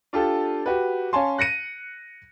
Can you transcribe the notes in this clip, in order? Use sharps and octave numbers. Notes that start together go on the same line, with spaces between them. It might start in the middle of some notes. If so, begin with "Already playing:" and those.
D4 F4 G4 A4
F#4 G4 B4
C#4 C#5 F5 G#5 A5 C6
F#6 A#6 C#7 D#7